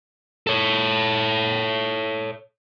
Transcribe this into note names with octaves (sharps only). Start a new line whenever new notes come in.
A4 C#5